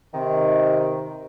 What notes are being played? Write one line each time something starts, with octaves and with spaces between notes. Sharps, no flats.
C3 D#3